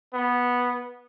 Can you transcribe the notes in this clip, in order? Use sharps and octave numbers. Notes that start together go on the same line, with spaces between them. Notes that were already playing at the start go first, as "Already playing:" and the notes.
B3